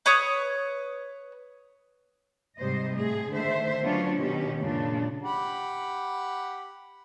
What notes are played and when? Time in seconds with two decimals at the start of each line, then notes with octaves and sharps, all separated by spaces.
0.06 B4 C#5 D#6
2.57 G#2 C3 G3 C5 D#5
2.92 A2 G#4
3.30 D3 D#3 A3 C5 E5
3.83 F#3 B3 C#4 D4 F4 C#5
4.19 B2 D#3 C#4 G4
4.58 F#2 A#2 C#3 G#3 D4 F4
5.23 G4 F#5 B5